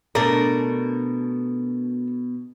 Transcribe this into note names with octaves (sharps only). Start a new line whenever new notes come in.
B2 A3 D4 A#4